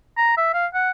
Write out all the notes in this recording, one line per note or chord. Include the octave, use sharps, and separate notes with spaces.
A#5
E5
F5
F#5